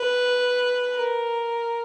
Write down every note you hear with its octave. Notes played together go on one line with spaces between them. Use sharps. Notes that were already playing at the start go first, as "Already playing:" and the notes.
Already playing: B4
A#4